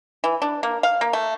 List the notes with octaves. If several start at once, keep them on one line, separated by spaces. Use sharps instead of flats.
E3
D4
A#3
F5
A#3
A3